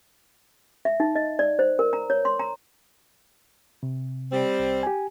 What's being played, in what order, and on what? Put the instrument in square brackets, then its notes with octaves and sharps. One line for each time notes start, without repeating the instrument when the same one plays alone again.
[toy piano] E5
D#4
D#5
D5
C5
A#4
A#5
C#5
C6
A#5
[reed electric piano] C3
[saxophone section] G3 C4
[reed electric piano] C2
G4 G#5